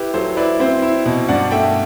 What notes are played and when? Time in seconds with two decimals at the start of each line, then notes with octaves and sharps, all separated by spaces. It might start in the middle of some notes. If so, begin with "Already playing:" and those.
Already playing: E4 G4 B4
0.14 F#3 A4 C5
0.37 E4 B4 D5
0.60 C4 C5 E5
0.82 E4
1.06 B2
1.28 G2 D5 F#5
1.51 A3 E5 G5